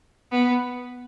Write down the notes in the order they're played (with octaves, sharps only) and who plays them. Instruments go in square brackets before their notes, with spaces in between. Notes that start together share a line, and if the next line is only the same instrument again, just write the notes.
[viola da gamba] B3